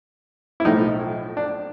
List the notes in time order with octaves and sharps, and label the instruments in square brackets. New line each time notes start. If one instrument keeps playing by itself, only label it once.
[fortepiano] E4
B1 A2 F3 D#4
D4